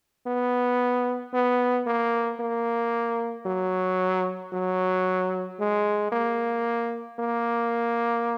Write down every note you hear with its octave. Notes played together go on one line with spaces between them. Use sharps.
B3
B3
A#3
A#3
F#3
F#3
G#3
A#3
A#3